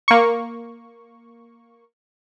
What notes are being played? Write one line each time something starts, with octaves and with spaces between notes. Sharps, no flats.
A#3 C#6